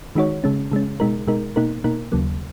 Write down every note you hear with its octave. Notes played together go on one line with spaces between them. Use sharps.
D#3 G#3 D#4 F#4 C#5
C#3 G#3 C#4
C#3 G#3 C#4
B2 G#3 D#4 A#4
B2 G#3 D#4 A#4
B2 A#3 D#4 A#4
B2 A#3 D#4 A#4
D#2 C#3 F#3 A#3